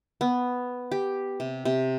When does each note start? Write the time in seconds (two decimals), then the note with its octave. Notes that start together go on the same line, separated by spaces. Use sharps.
0.21 B3
0.91 G4
1.40 C3
1.65 C3